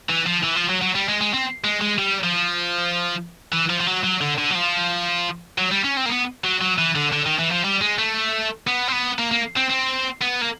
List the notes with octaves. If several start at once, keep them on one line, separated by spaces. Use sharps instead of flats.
E3
F3
E3
F3
F#3
F#3
G3
G#3
G#3
C4
G#3
G#3
G3
F3
E3
F3
F3
F#3
F#3
D3
D3
F#3
F3
F#3
G3
C#4
C4
A#3
B3
F#3
F#3
E3
D3
D3
D#3
E3
F3
G3
G#3
A3
B3
C4
B3
A#3
A#3
C4
C4
B3
A#3